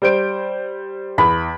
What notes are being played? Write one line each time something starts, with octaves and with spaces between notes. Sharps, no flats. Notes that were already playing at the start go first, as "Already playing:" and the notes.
G3 C5 D7
E2 B5